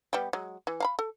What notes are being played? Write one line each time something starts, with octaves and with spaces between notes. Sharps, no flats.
G3 B3 G4
F#3 G#3
E3
F5 A#5 B5
A4